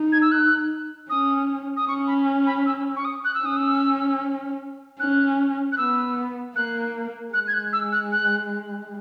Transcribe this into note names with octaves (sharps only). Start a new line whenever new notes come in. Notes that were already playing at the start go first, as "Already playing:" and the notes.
Already playing: D#4
G#6
E6
F#6
C#4 D#6
D#6
C#4 C#6
B5
B5
E6
C#6
D#6
F#6
E6
C#4 D#6
E6
C#4 F#6
F#6
B3 E6
A#3 F#6
G#3 F#6
G#6
F#6
E6
F#6
F#6